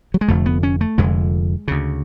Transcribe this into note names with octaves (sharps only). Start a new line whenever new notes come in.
F#3
G#3
F1 F2 D3 A3
B3
C#4
A3
F1 F2 D3 G#3
D2 C#3